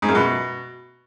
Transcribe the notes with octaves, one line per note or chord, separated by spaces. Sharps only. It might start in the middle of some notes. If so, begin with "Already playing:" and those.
G#2
F#2
B2